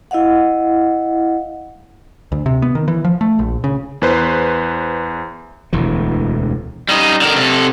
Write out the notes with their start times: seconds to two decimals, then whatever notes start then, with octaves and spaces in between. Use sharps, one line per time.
0.11 E4 D#5 F5 F#5
2.32 D2
2.46 C3
2.62 B3
2.75 D#3
2.88 E3
3.04 F3
3.21 A3
3.39 A#1
3.64 C#3
4.02 E2 B4 C5
5.73 E1 D2 E3
6.89 G3 D#4
7.21 D3 A#4
7.36 C3 A4